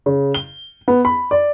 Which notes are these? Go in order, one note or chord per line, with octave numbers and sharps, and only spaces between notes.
C#3
G7
B3
B5
D5